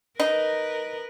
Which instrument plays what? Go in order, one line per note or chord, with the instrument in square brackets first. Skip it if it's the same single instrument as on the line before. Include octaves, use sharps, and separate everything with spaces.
[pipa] D#4 [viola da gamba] A#4 B4